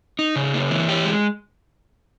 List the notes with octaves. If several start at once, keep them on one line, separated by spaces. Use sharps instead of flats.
D#4
C#3
A#3
E3
G4
G#3